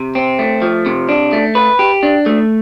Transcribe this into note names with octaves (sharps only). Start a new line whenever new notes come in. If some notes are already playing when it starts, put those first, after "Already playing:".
Already playing: C3
C4
A3
F3
C3
D4
A3
B4
G4
D4
A3